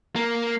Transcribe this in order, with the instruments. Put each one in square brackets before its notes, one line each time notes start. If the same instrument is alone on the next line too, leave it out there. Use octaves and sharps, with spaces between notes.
[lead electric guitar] A#3